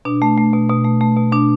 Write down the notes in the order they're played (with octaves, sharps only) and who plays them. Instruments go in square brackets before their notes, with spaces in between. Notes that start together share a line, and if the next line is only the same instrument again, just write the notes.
[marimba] B2 D4
A3
A3
B2
B2
A3
A3
B2
B2 D4